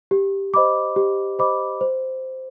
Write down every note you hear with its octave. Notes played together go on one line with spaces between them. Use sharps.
G4
C5 D#5 B5 D6
G4
C5 D#5 B5 D6
C5